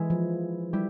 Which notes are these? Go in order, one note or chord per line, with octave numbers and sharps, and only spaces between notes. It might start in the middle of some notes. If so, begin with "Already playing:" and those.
Already playing: E3 G#3 E4
F3
G3 E4 G4